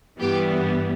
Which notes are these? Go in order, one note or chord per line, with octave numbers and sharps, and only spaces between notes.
G2 E3 G3 B3 G4